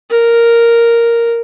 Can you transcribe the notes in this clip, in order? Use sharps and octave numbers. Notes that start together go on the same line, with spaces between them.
A#4